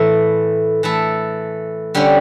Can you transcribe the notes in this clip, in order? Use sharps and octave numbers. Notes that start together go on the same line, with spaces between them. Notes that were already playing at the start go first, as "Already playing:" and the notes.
Already playing: A2 E3 A3 E4
E3 A3 E4 A4
D3 G3 C#4